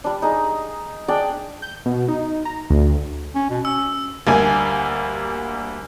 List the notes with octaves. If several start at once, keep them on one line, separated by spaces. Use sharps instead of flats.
G3 D4
D#4 G#4
D4 G#4 D5 G5
G6
B2
D#4
A#5
D2
C#4
B2
C#4 E6
D2 G3 A#3 G#5